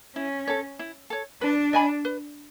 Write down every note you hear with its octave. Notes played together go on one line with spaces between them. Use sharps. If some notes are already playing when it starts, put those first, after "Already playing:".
C#4 E4
A4 C#5
E4
A4 C#5
D4 B4
D#5 G#5 B5
B4